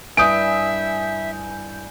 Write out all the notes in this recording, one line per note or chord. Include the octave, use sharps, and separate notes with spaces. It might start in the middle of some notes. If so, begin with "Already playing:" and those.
G2 E4 E5 G#5 D#6 G6 D7